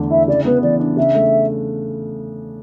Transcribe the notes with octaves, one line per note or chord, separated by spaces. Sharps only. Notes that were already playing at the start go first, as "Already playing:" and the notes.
Already playing: E2 D3 A3
E4 E5
C#3 D5
B3 B4
E3 D5
D4
C#3 E5
A3